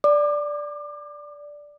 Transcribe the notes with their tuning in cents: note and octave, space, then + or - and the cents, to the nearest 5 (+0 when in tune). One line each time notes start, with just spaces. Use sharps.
D5 -5 D6 +30